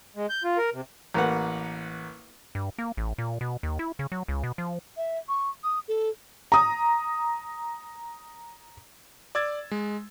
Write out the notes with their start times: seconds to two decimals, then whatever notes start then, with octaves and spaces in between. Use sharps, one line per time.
0.16 G#3
0.30 G6
0.44 F4
0.58 A#4
0.73 C3
1.14 A1 A#3 B4 F#5
2.55 G2
2.78 A#3
2.97 A1
3.18 A#2
3.41 B2
3.63 D#2
3.79 E4
3.99 C#3
4.12 F#3
4.28 C#2
4.44 B2
4.58 F3
4.97 E5
5.29 C#6
5.64 D#6
5.88 A4
6.52 A#5 D#6
9.35 D5 D6 E6 G#6 A6
9.71 G#3